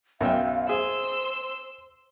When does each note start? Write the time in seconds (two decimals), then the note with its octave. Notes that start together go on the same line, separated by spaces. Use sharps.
0.21 B1 F#2 D#3 E5 F5 G5
0.69 G#4 C5 C6 E6